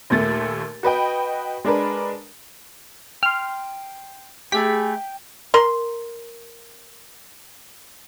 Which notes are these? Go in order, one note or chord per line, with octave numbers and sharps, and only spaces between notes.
D#2 A#2 A3 A6
F#4 B4 D#5 G5
G#3 D4 A#4 B4
G5 C6 F6
A3 G4 G#4 G5 B5 B6
A#4 C6